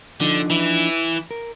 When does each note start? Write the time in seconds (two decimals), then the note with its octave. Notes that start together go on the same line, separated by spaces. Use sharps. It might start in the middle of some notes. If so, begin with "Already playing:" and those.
0.20 D3 F3 D4 D#4
0.50 E3 E4
1.31 A#4